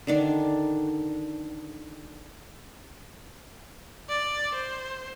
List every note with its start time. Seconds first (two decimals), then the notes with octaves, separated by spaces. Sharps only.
0.07 D3 D#3 D4
4.09 D5
4.55 C5